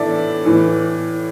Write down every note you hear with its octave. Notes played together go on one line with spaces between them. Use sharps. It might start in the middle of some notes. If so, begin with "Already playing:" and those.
Already playing: A2 E3 A4 D5 E5
A2 E3